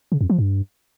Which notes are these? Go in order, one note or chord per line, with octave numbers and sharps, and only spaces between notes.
C#3
F2
F3
G2